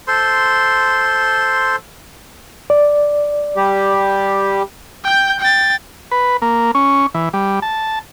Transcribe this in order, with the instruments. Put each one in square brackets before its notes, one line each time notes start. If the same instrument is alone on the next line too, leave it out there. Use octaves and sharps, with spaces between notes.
[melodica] A4 C5 C6
[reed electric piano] D5
[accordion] G3 G4
[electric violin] G5 G6
G5 A6
[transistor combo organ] B4
A#3
C#4
E3
G3
A5